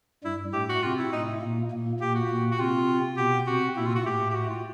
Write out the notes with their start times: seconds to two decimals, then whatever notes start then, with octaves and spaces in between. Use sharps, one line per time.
0.24 G2 G3 E4
0.53 A2 A3 G4
0.69 F#4
0.82 C3 C4 F4
0.98 E4
1.12 A2 A3 D#4
1.41 A#2 A#3
1.71 A#2 A#3
2.00 A#2 A#3 G4
2.15 F#4
2.29 A#2 A#3
2.51 F#4
2.59 C3 C4 F4
3.17 B2 B3 G4
3.47 C3 C4 F#4
3.76 A#2 A#3 E4
3.87 F4
3.95 F#4
4.05 A2 A3 G4
4.30 G4
4.35 F#4
4.50 F4